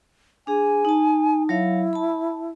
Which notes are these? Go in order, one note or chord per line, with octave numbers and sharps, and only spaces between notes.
D4 G#4 G#5
D#4 A5
F#3 E4 C#5 F5
A5 B5